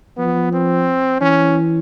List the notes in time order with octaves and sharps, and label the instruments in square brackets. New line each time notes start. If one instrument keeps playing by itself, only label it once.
[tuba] F3 [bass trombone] B3
[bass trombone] C4
[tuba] E3 [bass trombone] C#4